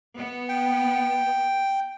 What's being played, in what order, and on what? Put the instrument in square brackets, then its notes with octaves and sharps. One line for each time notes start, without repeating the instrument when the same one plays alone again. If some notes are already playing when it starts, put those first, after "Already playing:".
[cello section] B3
[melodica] G5